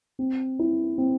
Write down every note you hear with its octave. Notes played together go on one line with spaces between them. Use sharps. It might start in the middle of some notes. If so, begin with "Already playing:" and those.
C4
E4
C4